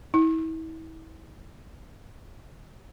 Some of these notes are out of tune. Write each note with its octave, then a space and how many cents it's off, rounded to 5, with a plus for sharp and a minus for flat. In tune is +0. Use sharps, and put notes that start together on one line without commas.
E4 -40